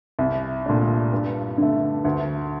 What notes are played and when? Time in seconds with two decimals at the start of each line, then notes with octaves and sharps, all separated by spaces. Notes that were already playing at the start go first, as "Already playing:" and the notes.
0.19 C2
0.66 A#2 A3 D4
1.12 G2
1.58 D3 A3
2.05 D2